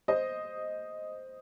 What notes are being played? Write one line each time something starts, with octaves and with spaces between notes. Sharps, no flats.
C5 D#5